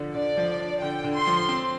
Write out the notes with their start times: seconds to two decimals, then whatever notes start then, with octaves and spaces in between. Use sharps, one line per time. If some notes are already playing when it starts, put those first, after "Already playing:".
Already playing: D3 F3 D4
0.14 D3 D5
0.37 F3
0.60 D4
0.82 D3 G5
1.04 D3
1.16 C6
1.27 F3
1.49 C4